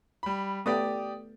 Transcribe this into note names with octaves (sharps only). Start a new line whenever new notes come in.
G3 B5
A3 B3 G4 D5 D#6